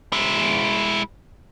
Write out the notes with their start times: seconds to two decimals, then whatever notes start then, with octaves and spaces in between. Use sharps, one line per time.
0.13 G#3 E4